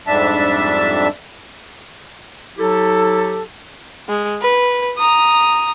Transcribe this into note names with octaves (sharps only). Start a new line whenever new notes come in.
F2 G#2 G3 D4 E5 A5
F#3 E4 G4 A4
G#3
B4
A#5 D#6